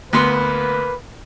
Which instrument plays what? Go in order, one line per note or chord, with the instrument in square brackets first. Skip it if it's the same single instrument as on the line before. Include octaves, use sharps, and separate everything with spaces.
[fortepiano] D2 B3 C6 [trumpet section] A#3 B4